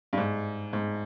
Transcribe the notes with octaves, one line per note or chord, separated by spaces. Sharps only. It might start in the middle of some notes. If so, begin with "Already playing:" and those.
G2
G#2
G#2